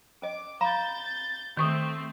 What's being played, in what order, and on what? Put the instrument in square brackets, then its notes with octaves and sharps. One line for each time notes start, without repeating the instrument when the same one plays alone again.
[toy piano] C#4 D#5 [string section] D6
[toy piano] F5 A#5 B5 [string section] G6 A6
[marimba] D#3 C#6 D#6 [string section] A3 C4